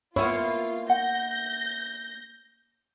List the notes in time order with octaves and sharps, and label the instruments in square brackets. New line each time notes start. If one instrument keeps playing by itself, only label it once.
[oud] A#3 B3 E4 [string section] F4 [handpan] C#5
[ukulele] F#5 [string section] G6 A#6